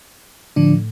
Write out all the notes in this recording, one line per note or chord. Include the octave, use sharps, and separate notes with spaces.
A2 D3 F3 D4